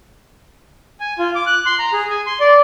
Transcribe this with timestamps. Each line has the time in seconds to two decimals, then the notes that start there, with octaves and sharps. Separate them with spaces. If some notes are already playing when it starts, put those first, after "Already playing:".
1.00 G#5
1.19 F4
1.35 D6
1.46 F#6
1.66 C6
1.79 A#5
1.93 G#4
2.10 G#5
2.27 C6
2.40 D5